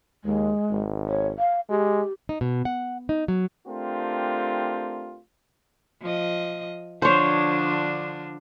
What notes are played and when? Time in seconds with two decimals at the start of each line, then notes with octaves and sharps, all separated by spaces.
0.24 D#2 G#3
0.71 G#1
1.09 C#5
1.39 F5
1.70 G#3 G4
2.29 D#4
2.41 B2
2.65 F#5
3.09 D#4
3.28 F#3
3.67 A3 C4 D4 F4 G4 A#4
6.02 F3 D#5
7.02 D3 F3 D4 C5 C#5